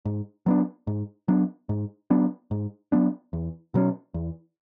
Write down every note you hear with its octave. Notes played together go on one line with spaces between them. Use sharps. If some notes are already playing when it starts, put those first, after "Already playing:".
G#2
F#3 B3 D4
G#2
F#3 B3 D4
G#2
F#3 B3 D4
G#2
F#3 B3 D4
E2
B2 F#3 C#4
E2